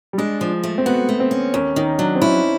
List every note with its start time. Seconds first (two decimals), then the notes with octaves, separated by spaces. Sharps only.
0.13 G3
0.18 G#3 D4
0.41 F3
0.64 A3
0.78 C4
0.86 B3 F#4
1.09 A3
1.20 C4
1.31 C#4
1.54 D#2 C#4
1.76 D#3 D#4
1.98 F#3 D4
2.15 C4
2.22 C#4 E4